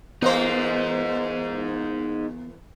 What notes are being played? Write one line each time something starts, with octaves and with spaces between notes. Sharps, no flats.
E2 A#3 B3 D#4 G#4 C5